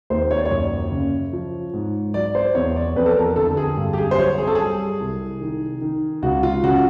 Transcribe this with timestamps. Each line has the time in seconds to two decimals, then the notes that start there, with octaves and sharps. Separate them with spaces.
0.10 D#2 C5
0.31 C#5
0.39 D5
0.45 C#5
0.51 F#2
0.92 C#3
1.33 F3
1.73 G#2
2.14 F#3 D5
2.35 C5
2.55 E2 C#5
2.76 D5
2.96 F2 B4
3.06 A4
3.17 A#4
3.36 D3 A4
3.57 G#4
3.77 G2
3.93 G4
3.98 G#4
4.11 C5
4.18 F#3 C#5
4.38 G#4
4.47 A4
4.55 G3 G#4
5.00 C2
5.41 D#3
5.81 D#3
6.22 C#2 F#4
6.43 F4
6.64 C#3 F#4